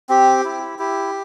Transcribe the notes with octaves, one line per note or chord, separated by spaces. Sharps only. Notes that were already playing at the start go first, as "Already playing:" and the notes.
C4 G4
E4
E4 G4